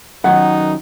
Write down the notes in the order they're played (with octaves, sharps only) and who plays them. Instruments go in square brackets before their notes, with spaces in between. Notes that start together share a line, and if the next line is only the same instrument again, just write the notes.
[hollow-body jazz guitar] F#2 D#3 F#3 [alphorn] D#4 [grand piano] F#5